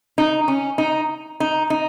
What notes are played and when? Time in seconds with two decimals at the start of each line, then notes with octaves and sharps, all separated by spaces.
0.18 D#4
0.48 C#4
0.78 D#4
1.40 D#4
1.70 D#4